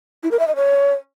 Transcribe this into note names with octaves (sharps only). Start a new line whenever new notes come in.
E4
A#4
E5
D#5
C#5